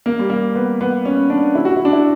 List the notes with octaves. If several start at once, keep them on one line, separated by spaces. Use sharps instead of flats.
A#3
G3
A#3
B3
B3
C#4
D4
E4
F#4
E4
D4
E4